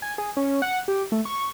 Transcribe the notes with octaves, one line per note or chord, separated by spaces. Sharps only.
G#5
G#4
C#4
F#5
G4
A3
C#6